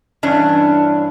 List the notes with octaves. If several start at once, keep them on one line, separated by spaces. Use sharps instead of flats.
G2 E3 C#4 D4